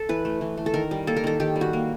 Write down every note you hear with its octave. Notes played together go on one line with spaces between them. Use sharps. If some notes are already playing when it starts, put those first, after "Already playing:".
Already playing: A4
E3 B4
A3
E3
A3
A4
D#3 A#4
G3
A#3 A4
A#4
D#3 A4
D#3 G4
G3
F#4
A#3